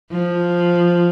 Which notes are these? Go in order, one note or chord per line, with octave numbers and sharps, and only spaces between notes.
F3